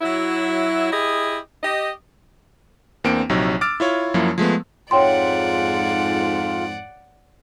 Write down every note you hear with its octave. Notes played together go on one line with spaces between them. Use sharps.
F#3 E4
E4 G4 G#4 D#5
G4 D#5
E2 A#3 C4 D4 G5 D7
A#1 C3 F#3 D#4 C#5
D6 E6 F6 A6 D7
E4 F4 C#5
F#2 F3 F#3 A#3 E4
F3 G#3 A3 B3
F2 G#2 F4 C#5 D5 F#5 G5 C6